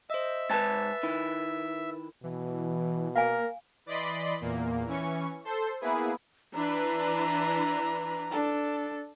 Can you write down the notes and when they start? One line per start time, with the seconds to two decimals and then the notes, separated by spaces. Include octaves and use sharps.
0.10 C5 D#5 E5
0.50 G#2 B4 G#5 A5 A6
1.03 D#3 E4
2.24 B2 E3
3.16 A#3 A#4 F5 G#5
3.86 E3 D5 D#5 B5 C6
4.40 E2 A#2 A#3
4.86 E3 C#4 C#6
5.45 A4 C5 C6
5.81 A#3 B3 E4 G#4 B4
6.54 E3 D4 B4 A#5
8.30 D4 A4